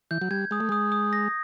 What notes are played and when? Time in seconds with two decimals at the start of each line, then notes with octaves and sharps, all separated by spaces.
0.11 E3 G6
0.21 F#3
0.31 G3 G#6
0.51 G#3 D#6
0.60 A3
0.69 G#3 D#6
0.92 D#6
1.13 A#6